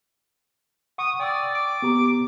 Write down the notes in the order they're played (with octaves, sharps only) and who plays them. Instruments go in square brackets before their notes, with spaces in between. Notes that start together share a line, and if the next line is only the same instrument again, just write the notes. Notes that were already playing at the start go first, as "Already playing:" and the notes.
[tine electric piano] F#5 C#6 [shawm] D#6
[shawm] D5 [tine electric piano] G5 C#6 E6
[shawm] D6
[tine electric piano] B3 G4 A#5